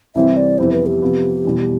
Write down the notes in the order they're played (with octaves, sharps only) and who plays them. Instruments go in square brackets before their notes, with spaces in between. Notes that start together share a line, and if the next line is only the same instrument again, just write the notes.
[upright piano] C2 C3 E3 G3 C4 [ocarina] E5
[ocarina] D5
[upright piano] F2 C3 E3 B3 E4 [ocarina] C5
[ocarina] B4
G4
[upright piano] C3 F3 B3
E2 B2 G3